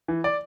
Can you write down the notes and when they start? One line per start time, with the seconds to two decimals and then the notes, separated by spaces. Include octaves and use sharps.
0.08 E3
0.24 D5